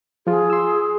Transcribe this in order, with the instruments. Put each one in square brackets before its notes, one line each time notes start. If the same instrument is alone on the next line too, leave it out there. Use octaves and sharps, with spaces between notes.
[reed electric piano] F3 F4 [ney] G#4
[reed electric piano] C6 E6